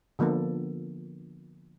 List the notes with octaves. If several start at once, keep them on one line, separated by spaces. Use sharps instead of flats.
D3 F3 A#3 B3 A4